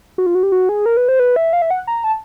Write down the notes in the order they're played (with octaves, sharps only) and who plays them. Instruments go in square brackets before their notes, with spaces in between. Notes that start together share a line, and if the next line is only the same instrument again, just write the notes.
[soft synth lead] F#4
F4
F#4
G4
F#4
G#4
A#4
B4
C5
B4
E5
F5
E5
F#5
A#5
A5